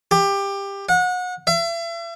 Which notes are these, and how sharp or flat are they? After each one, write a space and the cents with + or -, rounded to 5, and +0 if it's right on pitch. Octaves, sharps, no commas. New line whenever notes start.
G4 +20
F#5 -30
E5 +40